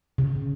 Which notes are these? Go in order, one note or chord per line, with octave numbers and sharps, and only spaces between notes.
C#3